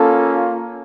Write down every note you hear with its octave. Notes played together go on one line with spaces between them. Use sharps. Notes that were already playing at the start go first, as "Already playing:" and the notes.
Already playing: A#3 C#4 F4 A4